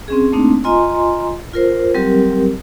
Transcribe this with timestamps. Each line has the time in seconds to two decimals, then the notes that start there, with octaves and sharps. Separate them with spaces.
0.08 C4 C#4 G#4
0.32 A3 A#3 C4 D4 D#4
0.64 F4 D#5 G#5 A#5 C6
1.54 F4 A#4 C5
1.94 F#3 G3 C4 G4 A#4